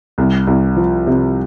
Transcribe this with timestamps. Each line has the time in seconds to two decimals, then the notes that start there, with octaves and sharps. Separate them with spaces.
0.18 C2
0.47 C2
0.76 F3
1.07 C3